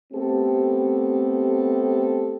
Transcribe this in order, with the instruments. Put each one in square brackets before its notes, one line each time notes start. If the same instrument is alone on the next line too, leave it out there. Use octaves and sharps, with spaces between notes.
[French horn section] A3 B3 C4 G4 A4